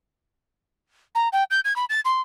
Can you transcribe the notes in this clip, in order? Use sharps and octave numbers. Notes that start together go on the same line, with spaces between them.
A#5
G5
G6
G#6
B5
A6
C6